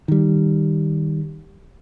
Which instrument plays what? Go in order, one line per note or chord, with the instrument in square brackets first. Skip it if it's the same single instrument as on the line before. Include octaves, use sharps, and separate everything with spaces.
[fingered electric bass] D#3 G3